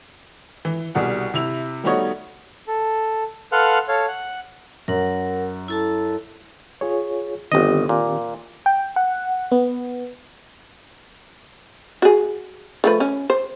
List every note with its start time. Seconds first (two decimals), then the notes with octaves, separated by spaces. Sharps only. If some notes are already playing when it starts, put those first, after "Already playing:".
0.65 E3
0.95 C2 B2 G3 G#4 F#5
1.34 C3 E4 F7
1.84 G3 A3 B3 D#4 F#4 C#5
2.68 A4
3.52 A4 B4 F5 F#5 C6 F6
3.88 A4 C#5 F5
4.08 F#5
4.88 F#2 A#4 F#5
5.68 E4 A4 A5
6.81 F4 G#4 C#5
7.52 G1 D#3 C4 G4 D#5
7.89 A#2
8.66 G5
8.96 F#5
9.52 B3
12.02 F#4 G#4
12.84 F3 A3 B4
13.00 C#4
13.30 C5